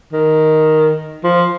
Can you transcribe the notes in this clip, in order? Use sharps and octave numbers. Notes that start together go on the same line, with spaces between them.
D#3
F3